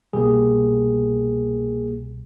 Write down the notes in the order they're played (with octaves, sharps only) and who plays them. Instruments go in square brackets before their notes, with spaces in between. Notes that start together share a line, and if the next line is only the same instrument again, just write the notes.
[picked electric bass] C2 B2 G3 [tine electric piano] A#3 G4 G#4